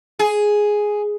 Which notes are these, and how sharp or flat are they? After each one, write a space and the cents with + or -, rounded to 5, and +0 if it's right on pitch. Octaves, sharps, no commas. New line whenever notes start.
G#4 +5